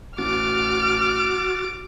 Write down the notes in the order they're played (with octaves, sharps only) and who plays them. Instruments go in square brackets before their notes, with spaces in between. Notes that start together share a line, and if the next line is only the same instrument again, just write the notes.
[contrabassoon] A1 [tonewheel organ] F#4 A6 [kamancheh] D6 [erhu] F6